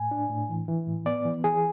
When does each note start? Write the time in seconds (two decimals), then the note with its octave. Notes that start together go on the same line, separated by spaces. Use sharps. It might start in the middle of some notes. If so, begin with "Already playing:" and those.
Already playing: A2 G#5
0.11 D4
0.30 A2
0.49 E3
0.68 E3
0.87 A2
1.06 B3 D5
1.25 E3
1.44 E3 G#4